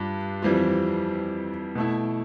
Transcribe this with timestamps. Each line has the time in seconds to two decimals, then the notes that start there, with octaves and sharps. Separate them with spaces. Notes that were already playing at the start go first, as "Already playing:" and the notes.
Already playing: G2 D4 F4
0.42 F2 E3 G3 C4 F4
1.75 B2 A3 E4